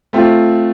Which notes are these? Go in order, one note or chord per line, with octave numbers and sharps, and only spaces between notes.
A3 C4 F4